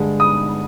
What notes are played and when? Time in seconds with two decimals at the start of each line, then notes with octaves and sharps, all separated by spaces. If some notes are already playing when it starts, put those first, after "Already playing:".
Already playing: G2 D3 G#3
0.20 D#6